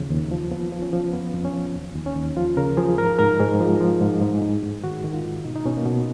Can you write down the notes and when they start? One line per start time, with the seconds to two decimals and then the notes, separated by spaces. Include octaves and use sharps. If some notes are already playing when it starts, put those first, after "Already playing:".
Already playing: D#2 C#3 F3
0.10 D#2
0.31 F3
0.51 F3 B3
0.72 F3
0.82 C#4
0.93 F3
1.13 F2 B3
1.34 F2
1.45 C#4
1.54 F3
1.75 D#2
1.95 D#2
2.06 C#4
2.16 D#2
2.37 F3 F4
2.57 C#3 A#4
2.77 F3 G#4
2.98 G#2 A#4
3.19 G#2 A#4
3.40 G#2 G#4
3.60 F3
3.81 F3
4.01 G#2
4.21 G#2
4.42 G#2
4.63 G#2
4.83 D#3 F#4
5.04 D#3
5.14 F4
5.25 G#2
5.44 B2 D#4
5.56 D#4
5.65 B2 C#4
5.77 A#3
5.85 B2 B3